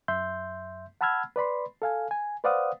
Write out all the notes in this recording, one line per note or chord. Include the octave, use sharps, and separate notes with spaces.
F#2 E5 C6 G6
F#5 A5 B5 E6 F6 G#6
B4 D5 B5 C6
A4 F5 G#5
G#5
B4 C5 D5 F5 F#5 D#6